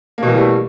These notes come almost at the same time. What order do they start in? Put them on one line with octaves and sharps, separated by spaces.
A#3 B2 E3 G3 A3